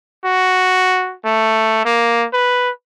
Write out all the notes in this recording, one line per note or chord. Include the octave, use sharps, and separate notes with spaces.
F#4
A3
A#3
B4